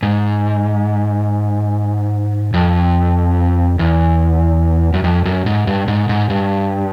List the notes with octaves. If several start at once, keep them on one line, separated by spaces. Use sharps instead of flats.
G#2
F2
E2
F#2
F2
F#2
G#2
G2
G#2
G#2
G2